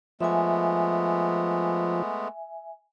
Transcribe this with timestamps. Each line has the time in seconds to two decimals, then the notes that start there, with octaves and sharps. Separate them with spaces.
0.21 F3 G#3 A3 B3 E5 G#5